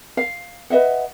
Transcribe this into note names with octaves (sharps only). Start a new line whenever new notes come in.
F5
B4 D#5 E5 F#5